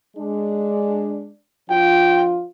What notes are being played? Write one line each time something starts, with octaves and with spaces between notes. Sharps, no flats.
G#3 D4
F3 D4 F4 G5